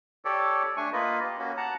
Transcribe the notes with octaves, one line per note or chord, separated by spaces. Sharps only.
G4 A4 C#5 D5
A3 D4 G#5 C#6
A#3 F4 B4 D#5
G4
A#3 C#4 F#4
F#5 A5 A#5